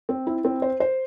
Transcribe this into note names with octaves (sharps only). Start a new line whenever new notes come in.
C4
E4
C4
C5
C5